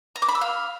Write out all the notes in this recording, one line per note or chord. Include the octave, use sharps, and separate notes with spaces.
A#5
D6
B5
E6
F5